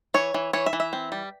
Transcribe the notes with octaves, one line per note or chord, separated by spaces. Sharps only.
E3 C#5
E3
E3 C#5
E5
E3
E5
C4
G3